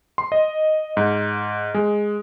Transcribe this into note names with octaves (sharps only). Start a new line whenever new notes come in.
C6
D#5
G#2
G#3